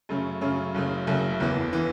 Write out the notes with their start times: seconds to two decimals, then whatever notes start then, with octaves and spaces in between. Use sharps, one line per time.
0.09 F#2 C#3 A3 C#4
0.41 F#2 C#3 A3 C#4
0.74 F#1 F#2 C#3 A3
1.07 F#1 F#2 C#3 A3
1.40 F#1 E2 E3 B3
1.73 E3 B3